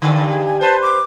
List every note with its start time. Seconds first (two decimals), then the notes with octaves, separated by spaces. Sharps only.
0.02 G2 D3 A4
0.29 G#4
0.46 G#5
0.61 B4 C5 A5
0.82 D6